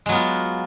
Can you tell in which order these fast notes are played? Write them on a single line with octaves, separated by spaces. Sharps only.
G#3 F#3 B3 F4